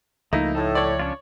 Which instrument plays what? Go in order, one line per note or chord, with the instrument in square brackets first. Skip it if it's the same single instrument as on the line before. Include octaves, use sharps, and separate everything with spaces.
[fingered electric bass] C#2 F3 [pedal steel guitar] A3 A#3 E4 [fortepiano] D#4
[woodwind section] A2 [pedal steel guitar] A4
[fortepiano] C#5 D5
[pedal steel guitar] C#4 D4 F4